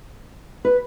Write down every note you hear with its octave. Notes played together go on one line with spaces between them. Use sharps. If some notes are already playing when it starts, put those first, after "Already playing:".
B4